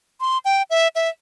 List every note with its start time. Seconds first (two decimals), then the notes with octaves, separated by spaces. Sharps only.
0.20 C6
0.45 G5
0.70 E5
0.95 E5